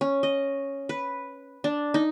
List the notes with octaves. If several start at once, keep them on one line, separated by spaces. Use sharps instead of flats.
C#4
D#5
B4
D4
D#4